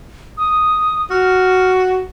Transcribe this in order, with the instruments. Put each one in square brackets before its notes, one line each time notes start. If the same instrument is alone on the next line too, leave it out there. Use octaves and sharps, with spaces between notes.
[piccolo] D#6
[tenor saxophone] F#4 [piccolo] F6